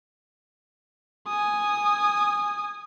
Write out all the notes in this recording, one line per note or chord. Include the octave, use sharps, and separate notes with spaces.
G#5 D#6